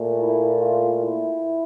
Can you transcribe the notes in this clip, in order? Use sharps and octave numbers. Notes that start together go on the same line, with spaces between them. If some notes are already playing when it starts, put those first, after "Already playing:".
Already playing: A#2 A3
E4
F4
E4